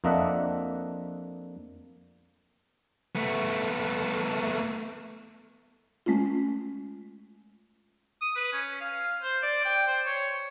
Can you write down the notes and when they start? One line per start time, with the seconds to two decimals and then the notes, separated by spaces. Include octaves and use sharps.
0.04 F2 A#3 D4 D#5 E5 F#5
3.15 A3 B3
6.06 G#3 A3 C#4 F4
8.21 D#6
8.36 B4
8.53 C#4
8.81 F5
9.22 C5
9.42 D5
9.65 G5
9.87 C5
10.06 C#5